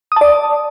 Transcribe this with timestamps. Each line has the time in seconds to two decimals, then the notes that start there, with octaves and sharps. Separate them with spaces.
0.12 D#6
0.16 A5
0.21 D5